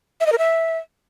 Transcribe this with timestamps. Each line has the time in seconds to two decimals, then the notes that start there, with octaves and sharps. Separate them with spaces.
0.20 E5
0.26 D#5
0.32 A#4
0.38 E5